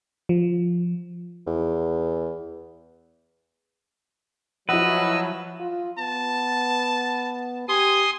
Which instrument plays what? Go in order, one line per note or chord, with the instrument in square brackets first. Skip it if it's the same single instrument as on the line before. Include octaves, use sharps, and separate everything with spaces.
[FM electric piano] F3
[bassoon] E2
[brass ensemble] F3 F#3 [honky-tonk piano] E4 F#5 [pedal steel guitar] B4 [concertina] D#5 E6
[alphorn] F4
[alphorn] B3 [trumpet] A5
[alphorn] G4 [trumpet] G#5 [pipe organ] C6 D#6